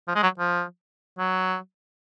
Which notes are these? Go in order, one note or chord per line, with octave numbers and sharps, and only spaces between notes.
F3
G#3
F#3
F3
F#3